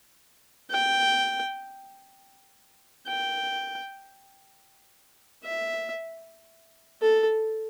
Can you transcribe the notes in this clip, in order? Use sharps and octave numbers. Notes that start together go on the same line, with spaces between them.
G5
G5
E5
A4